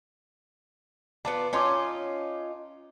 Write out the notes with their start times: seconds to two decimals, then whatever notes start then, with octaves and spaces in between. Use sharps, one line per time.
1.25 B3 F4 D5 A5
1.53 C#4 D#4 F4 A5 C6 D6